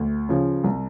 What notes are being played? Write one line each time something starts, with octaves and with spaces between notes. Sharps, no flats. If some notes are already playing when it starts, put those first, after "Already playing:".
Already playing: D2
C#3 F3
C2